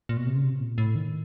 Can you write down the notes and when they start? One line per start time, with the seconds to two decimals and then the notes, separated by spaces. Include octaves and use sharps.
0.09 A#2
0.17 B2
0.27 C3
0.35 C#3
0.44 C3
0.60 A#2
0.78 A2
0.96 D#3